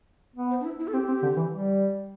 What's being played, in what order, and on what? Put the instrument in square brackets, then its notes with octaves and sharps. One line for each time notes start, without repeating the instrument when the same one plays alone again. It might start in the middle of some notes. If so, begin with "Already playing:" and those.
[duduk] B3
[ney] C5
D4
E4
E4
A4
[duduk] C4 [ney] G4
[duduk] C4
D3
E3
G3